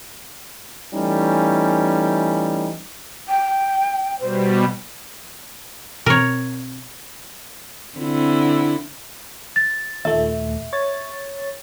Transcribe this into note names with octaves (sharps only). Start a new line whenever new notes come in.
E3 G3 A3 C#4 D#4
G5
B2 G3 C5
B2 C4 A#4 C#5
D3 C4 E4
A6
D#2 A#2 A3 E5
C#5 A6